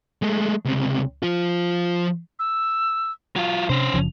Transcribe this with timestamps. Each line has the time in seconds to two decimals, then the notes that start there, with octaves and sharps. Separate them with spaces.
0.22 G#3 A3
0.65 C#2 C3
1.23 F3 F4
2.39 E6
3.36 F#3 F4
3.69 C3 C#4 D4 C5
3.94 F#1 C#3 F3